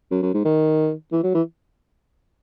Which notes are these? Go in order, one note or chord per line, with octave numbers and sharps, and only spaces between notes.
F#2
F#2
G#2
D#3
E3
F#3
E3